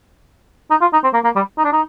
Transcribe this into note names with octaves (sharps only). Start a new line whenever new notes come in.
D#4
F4
D#4
C4
A#3
A#3
G3
D#4
D4
D#4